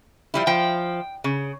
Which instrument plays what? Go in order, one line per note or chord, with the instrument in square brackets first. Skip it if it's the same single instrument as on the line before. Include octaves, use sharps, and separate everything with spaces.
[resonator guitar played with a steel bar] F3 G3 E4
[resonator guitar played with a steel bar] F3 [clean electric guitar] G5
[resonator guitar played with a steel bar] C#3